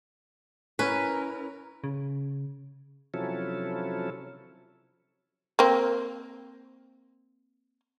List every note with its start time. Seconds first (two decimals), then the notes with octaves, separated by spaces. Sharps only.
0.79 C#4 E4 A#4 B4
1.84 C#3
3.14 C3 F3 F#3 C#4 E4 A4
5.59 A#3 C4